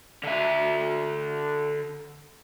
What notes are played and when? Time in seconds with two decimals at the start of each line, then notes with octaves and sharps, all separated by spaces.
0.23 D3 E5